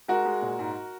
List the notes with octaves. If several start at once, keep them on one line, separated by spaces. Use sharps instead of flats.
G#3 F#4 A#4
G#3
A#2
G#2